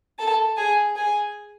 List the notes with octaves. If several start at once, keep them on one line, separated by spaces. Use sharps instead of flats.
A4 A5
G#4 G#5
G#4 G#5